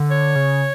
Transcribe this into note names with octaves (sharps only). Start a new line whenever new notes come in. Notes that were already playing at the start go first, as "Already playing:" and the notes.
Already playing: D3
C#5
C#3